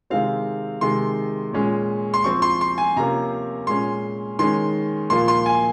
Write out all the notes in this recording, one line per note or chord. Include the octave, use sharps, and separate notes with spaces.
C3 D#3 G#3 C4 F5
C3 D#3 G#3 C6
A#2 G#3 C#4
C6
F3 C4 C#6
C6
C6
G#5
C3 F3 A#3 C#4 A#5
A#2 G#3 C#4 C6
D#3 G#3 C#4 C6
A#2 F3 A#3 C6
C6
G#5